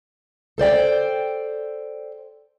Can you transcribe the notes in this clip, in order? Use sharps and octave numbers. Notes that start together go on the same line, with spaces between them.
A4 C5 D5 G5